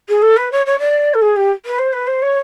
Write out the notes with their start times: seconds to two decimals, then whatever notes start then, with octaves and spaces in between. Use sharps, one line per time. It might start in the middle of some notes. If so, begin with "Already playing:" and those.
0.08 G#4
0.22 A4
0.36 B4
0.51 C#5
0.66 C#5
0.79 D5
1.14 A4
1.21 G#4
1.36 G4
1.65 B4
1.78 C5
1.93 B4
2.07 C5
2.22 C#5